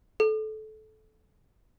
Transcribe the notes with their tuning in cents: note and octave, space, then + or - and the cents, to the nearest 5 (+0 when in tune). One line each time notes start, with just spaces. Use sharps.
A4 -20